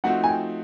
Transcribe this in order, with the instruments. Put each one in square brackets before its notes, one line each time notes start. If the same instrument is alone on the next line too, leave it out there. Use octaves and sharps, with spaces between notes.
[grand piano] F3 A3 C4 D#4 F#4 [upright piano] F#5
[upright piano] G#5
G5